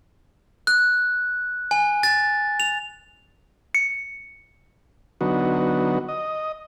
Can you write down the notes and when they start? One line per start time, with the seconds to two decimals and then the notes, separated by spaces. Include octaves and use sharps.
0.67 F#6
1.71 G#5
2.03 A6
2.60 F7
3.75 C#7
5.21 D3 F#3 B3 D#4 F#4
6.08 D#5